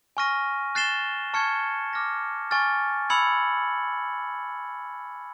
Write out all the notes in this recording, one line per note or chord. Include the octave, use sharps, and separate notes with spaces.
G#5 C#6 F6 A#6 D#7
F#6 A6 C7 E7 G7
A5 C#6 F6 G#6 C#7
D6 F6 A#6
G#5 C#6 F6 A6
B5 E6 G#6 C#7 F#7